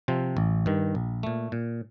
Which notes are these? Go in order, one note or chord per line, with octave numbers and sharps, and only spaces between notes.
C3 F3 C4
A1
G2 D#3
A#1
A#2 A3
A#2